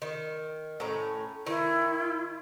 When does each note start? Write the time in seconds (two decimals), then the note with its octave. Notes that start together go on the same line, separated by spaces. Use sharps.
0.02 D#3
0.80 A2 C#4 A#5
1.46 D#3 E4